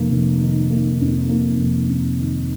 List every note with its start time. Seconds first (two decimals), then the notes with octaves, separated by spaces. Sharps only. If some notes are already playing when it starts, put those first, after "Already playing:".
Already playing: F1 A#3
0.11 F1
0.41 D#3
0.70 A#3
1.01 F2
1.29 A#3
1.59 F1
1.88 F2
2.18 D#3